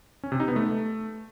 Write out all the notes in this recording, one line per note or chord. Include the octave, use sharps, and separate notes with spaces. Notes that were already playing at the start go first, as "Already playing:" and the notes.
C#4
C3
D#4
B3
A3